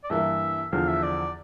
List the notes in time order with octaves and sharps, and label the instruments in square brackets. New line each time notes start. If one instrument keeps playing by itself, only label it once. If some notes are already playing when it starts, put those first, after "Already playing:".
[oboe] D5
[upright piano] G2 E3 A#3 E4 [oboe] E5
[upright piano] E2 D3 F3 [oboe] F5
[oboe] E5
D5